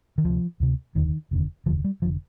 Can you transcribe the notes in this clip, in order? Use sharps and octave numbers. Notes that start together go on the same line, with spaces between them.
D#3
D2 C3 F3
D2 C3
F1 D#2 D3 D#3
F1 D#2 D3
F1 D#2 D3 F3
G3
F1 D3 F3